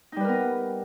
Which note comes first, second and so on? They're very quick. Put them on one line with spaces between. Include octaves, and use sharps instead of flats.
D#4 G3 B4 A#4 B3